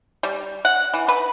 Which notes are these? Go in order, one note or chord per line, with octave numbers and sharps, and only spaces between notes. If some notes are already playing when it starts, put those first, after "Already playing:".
G3
F#5
E3
B4